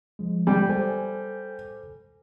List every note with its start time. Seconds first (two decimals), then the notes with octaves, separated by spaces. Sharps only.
0.19 F3 G#3
0.47 G3
0.70 A4 C5 G#5